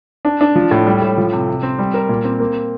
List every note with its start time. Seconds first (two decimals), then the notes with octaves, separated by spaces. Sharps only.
0.25 D4
0.41 D4
0.55 F3
0.71 A2
0.86 G3
1.02 A2
1.18 F3
1.33 C3
1.48 C3
1.63 C4
1.79 G3
1.94 A#4
2.09 A#2
2.24 C4
2.40 A#3